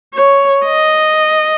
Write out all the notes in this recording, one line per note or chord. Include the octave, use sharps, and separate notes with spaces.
C#5
D#5